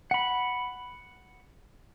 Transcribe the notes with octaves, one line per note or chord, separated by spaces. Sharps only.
F#5 B5